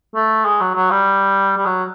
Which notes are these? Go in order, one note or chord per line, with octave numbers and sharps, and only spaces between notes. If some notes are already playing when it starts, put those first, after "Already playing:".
A3
G#3
F#3
F#3
G3
G3
F#3